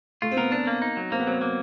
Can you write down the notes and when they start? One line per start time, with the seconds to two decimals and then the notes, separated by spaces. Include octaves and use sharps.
0.22 A3 F4
0.31 C4
0.37 B3 A#4
0.52 C4 D4
0.67 A#3
0.82 D#4
0.97 F#3
1.12 A#3 C4
1.19 B3
1.27 F#3 C4
1.41 A#3